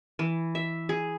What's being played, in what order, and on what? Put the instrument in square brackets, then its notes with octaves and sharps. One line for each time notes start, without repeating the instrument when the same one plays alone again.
[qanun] E3
E5
G#4